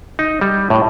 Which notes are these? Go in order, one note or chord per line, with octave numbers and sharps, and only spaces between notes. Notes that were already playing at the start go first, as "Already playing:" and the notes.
D#4
G3
A2